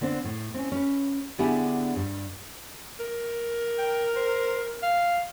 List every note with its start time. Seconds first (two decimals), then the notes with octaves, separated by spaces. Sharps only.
0.01 D3 B3 C4 D4
0.25 A2
0.54 C4 C#4
0.72 C#4 B4
1.38 D3 B3 D4 E4 G4 G#4
1.96 G2
3.00 A#4
3.79 G5
4.16 C5
4.83 F5